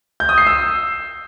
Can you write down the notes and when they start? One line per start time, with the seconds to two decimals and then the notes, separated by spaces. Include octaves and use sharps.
0.20 G6
0.29 D#6
0.38 C7
0.47 E6